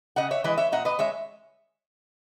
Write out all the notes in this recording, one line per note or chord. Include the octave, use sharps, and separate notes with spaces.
C#3 D#5 F#5
C#5 E5
E3 G#3 B4 D#5
C#5 E5
A#2 D#5 F#5
B4 D#5
G#3 C#5 E5